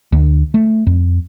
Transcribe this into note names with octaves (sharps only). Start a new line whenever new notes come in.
D2
A3
F2